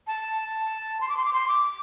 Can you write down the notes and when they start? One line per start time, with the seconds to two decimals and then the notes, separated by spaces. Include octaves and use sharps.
0.07 A5
1.01 C6
1.09 D6
1.17 C6
1.25 D6
1.33 C6
1.48 D6